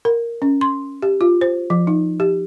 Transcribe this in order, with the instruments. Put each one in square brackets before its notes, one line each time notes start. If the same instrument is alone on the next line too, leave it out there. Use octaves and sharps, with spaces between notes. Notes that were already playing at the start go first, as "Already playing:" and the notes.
[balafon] A#4
C#4
C6
G4
F4
C5
F3
D#4
G4